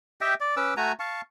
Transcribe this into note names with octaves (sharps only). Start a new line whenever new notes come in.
G4 D#5 E5 G5
D5
C#4 B4 D6 E6
A3 F#4 G#5 A#5
F5 A5 C#6